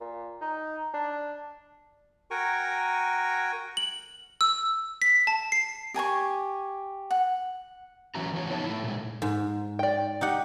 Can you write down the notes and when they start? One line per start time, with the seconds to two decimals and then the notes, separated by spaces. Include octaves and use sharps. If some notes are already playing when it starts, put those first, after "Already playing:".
0.01 A#2
0.41 D#4
0.94 D4
2.31 F#4 A#4 G5 G#5 A#5 C#6
3.77 F#7
4.41 E6
5.02 B6
5.27 A5
5.52 C7
5.94 G4 G#5 A5 C#6
7.11 F#5
8.15 E3 F#3 C#4 E4 F#4 A#5
8.33 E3 F3 C#5
8.49 B3 D#4 B4 C#5 E5 A5
8.66 A3 E4
8.84 A#2 G#3
9.22 G#2
9.79 D5 G5
10.21 D#4 G4 F#5